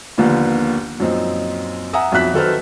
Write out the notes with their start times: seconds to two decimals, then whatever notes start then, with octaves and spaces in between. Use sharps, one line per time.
0.18 D#2 D3 F3 A#3 B3
1.00 F#2 A#2 F3 C4 D#4
1.93 E5 F#5 G#5 A#5 D#6 E6
2.12 B1 F2 F#3 E5 F#6 B6
2.34 D#3 F#3 A4 B4 C5 F6